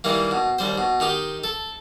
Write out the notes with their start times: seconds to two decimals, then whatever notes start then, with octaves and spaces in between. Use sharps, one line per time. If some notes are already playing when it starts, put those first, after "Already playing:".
0.04 D#3 E3 G3 A#3
0.31 B2
0.58 D#2 G3 C5
0.78 B2
1.00 D#3 D#4 G4
1.44 A4